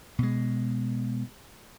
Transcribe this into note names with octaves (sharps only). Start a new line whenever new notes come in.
B2 G#3